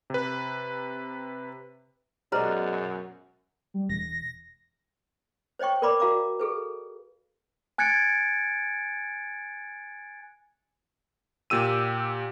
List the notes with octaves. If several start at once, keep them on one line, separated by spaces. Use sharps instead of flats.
C3 B4
F#2 B2 G#3 B4 C5 D5 D#5 A#5
G3
E1 A#6
C5 C#5 D#5 G5 C#6
A#4 B4 D5 B5 C6 D6
F#4 A#4 F5 A#5 D6
G#4 A4 B4
G#5 F#6 G#6 A6 C#7 D7
A#2 G4 E6 D#7